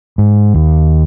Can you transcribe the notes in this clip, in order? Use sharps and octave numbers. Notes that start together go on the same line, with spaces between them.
G#2
D#2